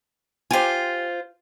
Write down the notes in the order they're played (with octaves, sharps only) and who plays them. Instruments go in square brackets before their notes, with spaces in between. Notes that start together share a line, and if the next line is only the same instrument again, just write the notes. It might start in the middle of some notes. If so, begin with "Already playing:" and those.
[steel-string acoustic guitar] F4 C5 [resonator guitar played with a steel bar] G4 G5 G#5